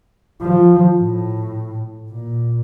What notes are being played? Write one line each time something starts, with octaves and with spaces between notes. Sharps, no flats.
F3
A2
A#2